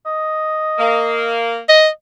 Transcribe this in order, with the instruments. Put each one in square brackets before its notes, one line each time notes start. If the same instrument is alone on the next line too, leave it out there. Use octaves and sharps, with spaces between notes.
[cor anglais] D#5
[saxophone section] A#3
[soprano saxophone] D#5